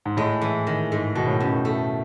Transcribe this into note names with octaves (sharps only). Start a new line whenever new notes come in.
G#2
A2 G#3
E3
D#3
G#2
B2 D#3
A2
F#2 B2
A3